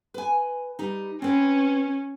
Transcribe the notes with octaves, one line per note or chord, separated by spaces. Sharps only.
B4 G#5
G3 D#4
C4 C#4 B4